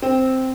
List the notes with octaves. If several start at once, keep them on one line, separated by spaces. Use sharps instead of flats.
C4